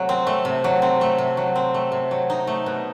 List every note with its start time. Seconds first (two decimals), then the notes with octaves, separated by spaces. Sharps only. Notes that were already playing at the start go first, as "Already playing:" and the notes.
Already playing: C3 F#3 A3
0.09 C4
0.27 A3
0.45 C3
0.64 F#3
0.82 C4
1.01 A3
1.18 C3
1.37 F#3
1.56 C4
1.74 A3
1.92 C3
2.11 F#3
2.30 D#4
2.47 A3
2.66 B2